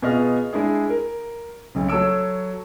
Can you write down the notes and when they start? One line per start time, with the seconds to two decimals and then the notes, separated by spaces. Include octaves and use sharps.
0.02 B2 F4 G#4 D#5 F6
0.53 G#3 D4 E4 G#4
0.89 A#4
1.75 B1 C#3
1.88 F#3 A4 C#5 E6 D7